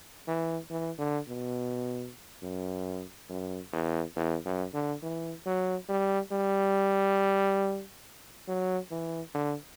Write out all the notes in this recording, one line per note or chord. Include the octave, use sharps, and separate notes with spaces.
E3
E3
D3
B2
F#2
F#2
E2
E2
F#2
D3
E3
F#3
G3
G3
F#3
E3
D3